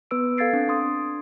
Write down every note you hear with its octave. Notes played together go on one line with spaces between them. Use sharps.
B3 B4 E6 D7
A4 F5 G#6 A6 C7 D7
C4 D4
D4 C6 D#6